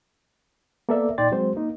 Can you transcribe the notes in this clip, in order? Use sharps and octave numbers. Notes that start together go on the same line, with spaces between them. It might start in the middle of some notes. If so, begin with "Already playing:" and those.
A#3 B3 A4 A#4 D5 E5
A#2 D#4 D5 G5 C6 A6
F#3 G#3 C4 C5
A#3 D#4